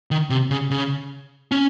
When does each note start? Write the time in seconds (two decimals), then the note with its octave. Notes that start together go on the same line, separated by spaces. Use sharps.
0.11 D#3
0.30 C3
0.51 C#3
0.71 C#3
1.52 C#4